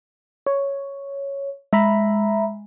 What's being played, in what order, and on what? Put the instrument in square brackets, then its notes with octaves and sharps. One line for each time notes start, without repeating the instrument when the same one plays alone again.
[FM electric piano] C#5
[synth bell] G#3 [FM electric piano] E5 A#5 B5